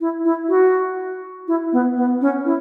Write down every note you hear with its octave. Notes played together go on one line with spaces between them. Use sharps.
E4
E4
F#4
E4
B3
B3
C#4
E4